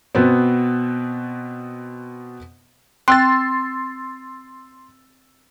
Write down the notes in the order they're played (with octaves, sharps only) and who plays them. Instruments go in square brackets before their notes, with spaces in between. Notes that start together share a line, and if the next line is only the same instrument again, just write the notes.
[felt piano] B2 B3 C4
[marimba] C4 G5 F#6 [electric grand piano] C6 E6 A6